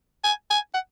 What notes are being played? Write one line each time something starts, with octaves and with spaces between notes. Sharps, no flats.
G#5
G#5
F#5